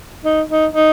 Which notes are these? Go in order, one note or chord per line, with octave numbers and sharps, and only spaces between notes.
D#4
D#4
D#4